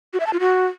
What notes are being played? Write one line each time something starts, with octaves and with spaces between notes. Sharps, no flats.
F#4
E5
A5
F4
F#4